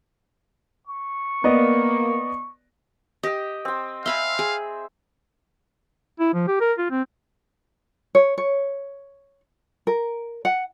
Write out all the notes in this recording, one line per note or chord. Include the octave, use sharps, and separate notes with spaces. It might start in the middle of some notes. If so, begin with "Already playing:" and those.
C#6
A#3 B3 D5 D#5
G4 D#5 G5
C4 G5
E5 F5 G#5 B5 C6
G#4
E4
F3
G4
A#4
F4
C4
C#5
C#5
A#4
F#5